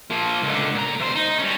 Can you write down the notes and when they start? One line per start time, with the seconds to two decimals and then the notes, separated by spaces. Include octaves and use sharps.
0.11 F3 A#3
0.43 C#2 D3
0.75 A#2 A#5
0.99 E2 C5
1.15 D#4
1.39 G3 C#4